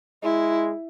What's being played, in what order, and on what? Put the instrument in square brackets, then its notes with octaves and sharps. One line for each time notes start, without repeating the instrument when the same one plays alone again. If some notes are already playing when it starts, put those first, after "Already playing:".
[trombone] G#3 [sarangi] E4